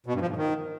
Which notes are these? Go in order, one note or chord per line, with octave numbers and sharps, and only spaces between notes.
B2
G2
F3
G#2
D#3